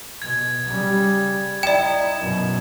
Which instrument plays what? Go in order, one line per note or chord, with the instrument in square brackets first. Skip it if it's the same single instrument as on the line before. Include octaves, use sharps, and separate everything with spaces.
[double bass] B2 [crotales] G#6
[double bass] C#3 G3
[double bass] D#4 E4 [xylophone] D5 G5 [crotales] E7
[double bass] F#2 B2